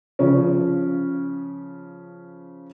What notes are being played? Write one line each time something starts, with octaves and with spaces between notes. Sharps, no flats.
C#3 F3 C#4